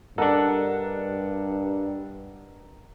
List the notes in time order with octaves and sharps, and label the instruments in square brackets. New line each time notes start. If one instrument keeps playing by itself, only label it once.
[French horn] G2 [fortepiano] D4 A4 [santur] A#4 D#5 F#5